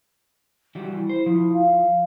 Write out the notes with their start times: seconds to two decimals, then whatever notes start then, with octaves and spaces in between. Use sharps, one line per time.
0.75 E3 G3 F#4
0.92 E4
1.09 C5
1.26 F3 E4
1.52 F5